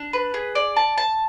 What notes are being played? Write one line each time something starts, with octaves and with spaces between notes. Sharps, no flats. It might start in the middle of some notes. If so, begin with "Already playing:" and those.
Already playing: D4
B4
G#4
D5
A5
A5